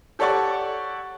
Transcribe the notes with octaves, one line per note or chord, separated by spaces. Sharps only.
G4 A4 C#5 D5 F#5 C#6